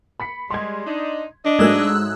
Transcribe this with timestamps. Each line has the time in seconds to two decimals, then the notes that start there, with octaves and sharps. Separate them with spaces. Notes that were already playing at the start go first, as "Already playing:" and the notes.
0.20 B5 B6 C#7
0.50 G3 G#3 C6 G#6
0.86 D4 D#4
1.45 D4 D#5
1.59 G#2 F#3 G#3 A3 E6 F#6